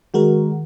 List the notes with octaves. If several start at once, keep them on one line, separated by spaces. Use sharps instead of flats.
D#3 G#3 F#4 A#4